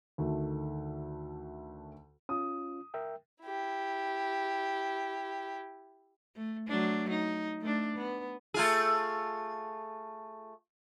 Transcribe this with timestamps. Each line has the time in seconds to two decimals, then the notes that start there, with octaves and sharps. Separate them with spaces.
0.18 D2 D#3 A3
2.29 C#4 F4 D#6
2.94 A#4 E5 G5
3.43 E4 G4
6.36 A3
6.68 F#3 A3 D4
7.10 D#4
7.61 A3 D4
7.97 B3
8.54 A3 F4 G#4